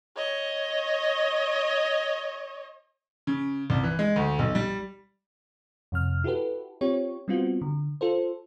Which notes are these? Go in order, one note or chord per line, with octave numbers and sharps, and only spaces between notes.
C#5 D#5
C#3
C2
E3
G#3
D2
B1
G3
F2 C3 F6
E4 F#4 G4 A4 B4
C4 F4 G4 C#5
G3 B3 C4 F4 F#4
D3
F4 A4 C5